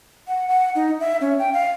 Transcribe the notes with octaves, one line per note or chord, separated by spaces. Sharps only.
F#5
F#5
D#4
E5
C#4
G5
F5